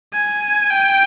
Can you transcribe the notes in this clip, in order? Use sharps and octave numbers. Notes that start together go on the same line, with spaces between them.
G#5
G5